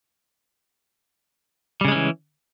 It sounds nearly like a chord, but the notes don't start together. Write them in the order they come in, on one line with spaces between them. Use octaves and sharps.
G3 C#3 G#3 C#4 E3